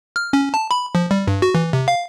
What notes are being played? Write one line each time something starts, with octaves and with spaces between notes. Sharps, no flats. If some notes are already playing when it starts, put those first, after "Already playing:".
F6
C#4
A5
B5
F3
G3
G2
F#4
E3
C3
F5